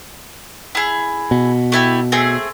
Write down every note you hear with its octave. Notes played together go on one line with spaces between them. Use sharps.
E4 G#4
B2
A3 E4 G4
A3 C4 G#4